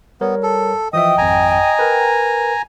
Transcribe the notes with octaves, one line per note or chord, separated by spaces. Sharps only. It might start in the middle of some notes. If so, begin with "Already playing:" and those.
G3 B3 A#4 C#5
A4
E3 F3 D#5 E5 G5 D#6
G#1 F2 G#5 A#5
A#4 B4